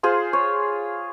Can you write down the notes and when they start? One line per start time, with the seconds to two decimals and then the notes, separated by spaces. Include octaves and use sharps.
0.03 F4 G#4 C5
0.33 C#5